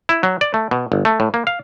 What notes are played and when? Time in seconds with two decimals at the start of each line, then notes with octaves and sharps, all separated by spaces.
0.09 E4
0.23 F#3
0.41 D5
0.54 A3
0.71 B2
0.92 G1
1.05 A3
1.20 A2
1.34 A#3
1.47 F5